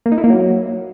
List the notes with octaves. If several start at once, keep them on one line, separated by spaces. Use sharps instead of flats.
A#3
D#4
E4
A#3
F#3